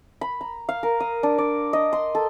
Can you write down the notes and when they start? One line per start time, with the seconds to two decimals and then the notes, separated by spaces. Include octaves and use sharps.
0.21 B5
0.41 A#5
0.69 F5
0.83 A#4
1.00 D#6
1.23 D4
1.38 D5
1.73 D#5
1.93 C6
2.15 A4